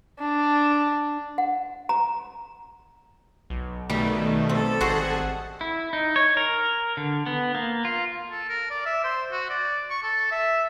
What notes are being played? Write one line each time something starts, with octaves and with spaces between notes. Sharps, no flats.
D4
F#5
A#5
B1
B2 D#3 G3 A3
G3 C4 A4
G#1 F#4 G#4 C5 F#5
E4
D#4
C#5
A#4
D3
B3
A#3
F4
A4
A#4
D5
E5
C5
F#4
D5
C#6
A4
E5